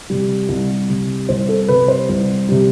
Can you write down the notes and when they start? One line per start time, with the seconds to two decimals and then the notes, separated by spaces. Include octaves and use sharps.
0.10 C3 G3
0.49 C2
0.90 C3 G3
1.29 C2 C5
1.49 A4
1.68 C3 G3 B4
1.88 C5
2.09 C2
2.49 C3 G3